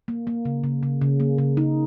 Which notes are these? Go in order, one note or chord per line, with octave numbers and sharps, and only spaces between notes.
A#3
A#3
C#3
C#3
C#3
C#3
A#3
C#3
C#3 D#4